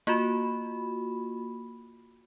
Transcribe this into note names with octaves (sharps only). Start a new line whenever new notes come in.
A#3 F4 F#4 B5